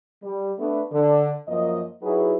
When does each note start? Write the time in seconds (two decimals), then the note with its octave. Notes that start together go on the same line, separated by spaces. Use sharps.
0.23 G3
0.58 A3 B3 D4
0.92 D3
1.48 F#2 F3 A#3 D#5
2.03 F#3 D#4 E4 F#4 G#4 B4